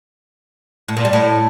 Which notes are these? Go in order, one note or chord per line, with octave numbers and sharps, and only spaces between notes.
A2
A#2
G3
A2